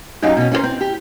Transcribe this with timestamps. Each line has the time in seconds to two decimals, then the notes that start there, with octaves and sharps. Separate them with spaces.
0.22 F#2 F#3 C#4 D#4 G4 F5
0.37 B2 C#4
0.52 C#4 F4 F#4 A#4 C5
0.63 C4
0.81 G4